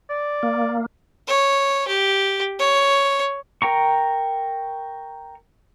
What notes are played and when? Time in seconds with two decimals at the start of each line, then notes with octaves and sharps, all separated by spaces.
0.10 D5
0.43 A#3
1.28 C#5
1.88 G4
2.60 C#5
3.62 A#4 G5 A#5 C#6